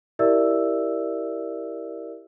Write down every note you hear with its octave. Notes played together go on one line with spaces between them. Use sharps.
E4 G4 A#4 D5 E5 E6